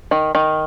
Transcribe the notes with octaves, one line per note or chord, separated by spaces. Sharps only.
D#3
D#3